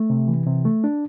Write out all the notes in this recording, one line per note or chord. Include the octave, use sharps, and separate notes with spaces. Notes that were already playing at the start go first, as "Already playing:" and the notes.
Already playing: A3
C3
E3
C3
A3
D4